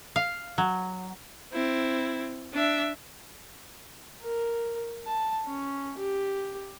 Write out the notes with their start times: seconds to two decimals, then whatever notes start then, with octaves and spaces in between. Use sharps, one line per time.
0.16 F5
0.58 F#3
1.53 C4 E4
2.53 D4 E5
4.22 A#4
5.06 A5
5.47 C#4
5.98 G4